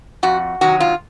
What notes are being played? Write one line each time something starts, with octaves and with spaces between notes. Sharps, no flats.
F2 F#4
C3 D#3 F#3 F#4
F4